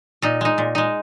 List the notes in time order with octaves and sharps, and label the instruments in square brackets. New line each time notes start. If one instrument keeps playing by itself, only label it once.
[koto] A#2 D#4
G#3 D#4
A#2
G#3 D#4